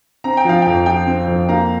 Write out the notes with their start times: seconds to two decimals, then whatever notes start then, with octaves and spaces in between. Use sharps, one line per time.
0.24 C4 A#5
0.37 G5
0.45 F3 F5
0.62 F2 G5
0.86 F3 G5
1.07 C4
1.28 F2
1.49 A#3 F5 A#5